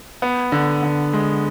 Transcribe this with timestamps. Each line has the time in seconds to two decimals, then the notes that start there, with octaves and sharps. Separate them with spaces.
0.22 B3
0.52 D3
0.83 D3
1.13 G#3